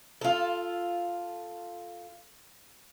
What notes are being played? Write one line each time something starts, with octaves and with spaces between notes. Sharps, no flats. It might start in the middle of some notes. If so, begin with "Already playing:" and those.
F4 A4